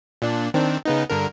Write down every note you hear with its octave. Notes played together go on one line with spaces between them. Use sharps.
A#2 D4
D#3 C4 D4
C#3 B3 D#4
G2 D3 A#4